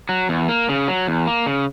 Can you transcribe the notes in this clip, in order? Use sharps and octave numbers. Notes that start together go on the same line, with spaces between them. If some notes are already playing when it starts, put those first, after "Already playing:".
F#3
E2
A#3
C#3
F#3
E2
A#3
C#3